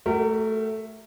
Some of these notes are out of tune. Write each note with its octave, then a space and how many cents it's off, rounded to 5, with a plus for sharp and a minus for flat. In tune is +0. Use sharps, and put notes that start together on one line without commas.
A3 +0 F#4 +35 A#4 -25